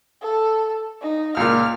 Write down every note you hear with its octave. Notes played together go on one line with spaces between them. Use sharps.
A4
D#4
C#2 A#2 F6